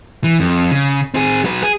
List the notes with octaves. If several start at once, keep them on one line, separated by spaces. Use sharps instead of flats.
E3
F2
C#3
C4 G#4
F#3 B4
G#4